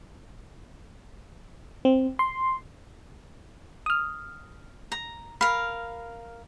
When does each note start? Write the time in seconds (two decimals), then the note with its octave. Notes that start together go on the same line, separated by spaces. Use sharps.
1.85 C4
2.19 C6
3.86 D#6 F6
4.92 A#5
5.41 A#4 F5 B5